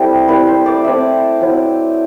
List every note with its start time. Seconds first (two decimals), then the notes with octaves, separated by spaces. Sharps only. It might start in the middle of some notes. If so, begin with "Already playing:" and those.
Already playing: G3 A3 C4 E4
0.28 G3 C4 E4 B4
0.47 C5
0.66 D5
0.84 A3 C4 E4 E5
1.40 F#3 C4 E4